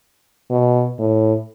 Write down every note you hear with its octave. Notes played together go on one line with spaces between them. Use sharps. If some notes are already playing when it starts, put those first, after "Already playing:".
B2
A2